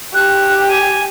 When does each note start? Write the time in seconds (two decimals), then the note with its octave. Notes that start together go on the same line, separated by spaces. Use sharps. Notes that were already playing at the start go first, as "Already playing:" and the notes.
0.14 G4 F#6
0.67 G#5